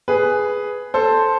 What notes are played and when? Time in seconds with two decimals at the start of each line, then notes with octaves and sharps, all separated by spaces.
0.08 G#4 B4
0.94 A4 C5